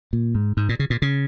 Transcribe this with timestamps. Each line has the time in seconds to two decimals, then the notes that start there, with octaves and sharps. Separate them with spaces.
0.13 A#2
0.35 G#2
0.57 G#2
0.69 A#2
0.79 C#3
0.90 A#2
1.02 C#3